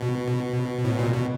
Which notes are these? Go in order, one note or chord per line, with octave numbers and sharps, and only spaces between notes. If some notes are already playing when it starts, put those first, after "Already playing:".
Already playing: B2
A2
A#2
B2